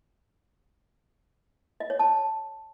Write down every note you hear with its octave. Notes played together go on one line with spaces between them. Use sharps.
D#5
C#5
A5